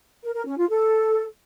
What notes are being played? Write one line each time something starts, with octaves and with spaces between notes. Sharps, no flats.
A#4
A#4
C#4
F4
A4